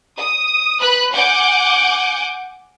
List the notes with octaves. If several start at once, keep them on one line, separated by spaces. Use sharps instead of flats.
D#6
B4 B5 F#6
F#5 G#5 D6 G6